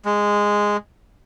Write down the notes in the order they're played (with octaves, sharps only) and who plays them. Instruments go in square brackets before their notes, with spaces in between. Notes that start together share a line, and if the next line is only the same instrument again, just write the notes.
[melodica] G#3